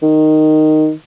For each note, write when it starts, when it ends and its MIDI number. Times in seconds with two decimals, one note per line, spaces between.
0.02 0.91 51